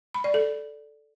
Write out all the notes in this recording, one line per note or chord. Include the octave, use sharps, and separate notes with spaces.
B5
D5
A4